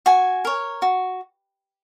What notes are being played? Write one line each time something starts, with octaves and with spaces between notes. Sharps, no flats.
F#4 G#5
A#4 C#5
F#4